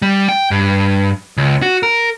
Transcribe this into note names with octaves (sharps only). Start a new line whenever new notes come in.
G3
G5
G2
C#2
F#4
A#4